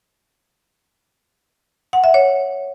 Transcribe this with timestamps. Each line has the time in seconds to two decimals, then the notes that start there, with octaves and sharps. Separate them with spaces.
1.93 F#5
2.04 E5
2.14 C#5